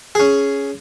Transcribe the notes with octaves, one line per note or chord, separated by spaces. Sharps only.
C#4 G#4